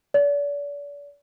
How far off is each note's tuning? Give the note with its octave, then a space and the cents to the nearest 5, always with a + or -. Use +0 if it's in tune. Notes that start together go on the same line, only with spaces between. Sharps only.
D5 -40